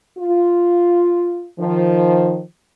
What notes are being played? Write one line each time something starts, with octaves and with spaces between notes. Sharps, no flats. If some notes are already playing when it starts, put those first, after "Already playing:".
F4
D#3 F3